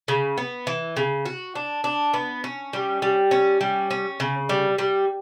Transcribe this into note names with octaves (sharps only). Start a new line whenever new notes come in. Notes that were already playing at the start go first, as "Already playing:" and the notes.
C#3
B3
E3
C#3
F#4
D4
D4
B3
C#4
G3
G3
C#4
G3
C#4
C#3
G3
G3